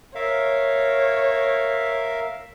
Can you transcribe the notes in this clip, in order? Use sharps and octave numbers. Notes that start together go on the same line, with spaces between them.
A#4 C#5 E5 F5